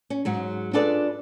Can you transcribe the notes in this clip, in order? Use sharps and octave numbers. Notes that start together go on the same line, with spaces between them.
C#4
G#2 F#3 G#3
D4 F4 G#4 A4 B4 D5